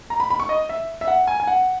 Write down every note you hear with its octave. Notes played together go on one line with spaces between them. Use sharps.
A#5
B5
B5
C#6
D#5
E5
E5
F#5
G#5
G#5
F#5